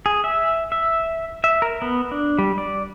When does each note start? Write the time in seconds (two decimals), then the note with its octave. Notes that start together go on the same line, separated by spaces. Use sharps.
0.06 G#4
0.24 E5
0.72 E5
1.44 E5
1.62 A#4
1.82 B3
2.11 D4
2.39 G3
2.58 D5